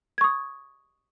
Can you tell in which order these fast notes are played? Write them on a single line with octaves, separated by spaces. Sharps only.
G#6 C#6 D#6